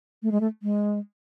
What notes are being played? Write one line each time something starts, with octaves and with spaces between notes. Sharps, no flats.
A3
G#3
A3
G#3